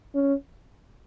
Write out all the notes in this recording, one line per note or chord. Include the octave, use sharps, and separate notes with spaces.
C#4